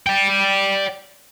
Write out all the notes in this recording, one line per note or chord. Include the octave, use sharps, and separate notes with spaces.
D5 G5